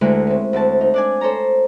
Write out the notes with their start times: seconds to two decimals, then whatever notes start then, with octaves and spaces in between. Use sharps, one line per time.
0.01 D2 D3 G#3 A3 E4 A#4
0.27 C4 C#4
0.53 D2 C4 E4 A5
0.81 D#4
0.94 D4 D5 G#5
1.21 A4 C5 C#5 A#5